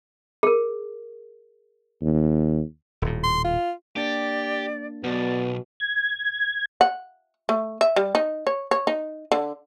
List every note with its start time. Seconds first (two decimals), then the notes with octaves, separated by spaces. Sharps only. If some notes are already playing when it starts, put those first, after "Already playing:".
0.43 G#4 A#4
2.02 D#2
3.02 D#1 A2
3.24 C6
3.45 F4
3.96 A#3 D4 G4 D5 A6
5.04 B1 B2 B3 D5
5.80 G#6
6.81 F#5
7.49 A3
7.81 E5
7.96 G3
8.15 D#4
8.47 C#5
8.71 C#5
8.87 D#4
9.32 D3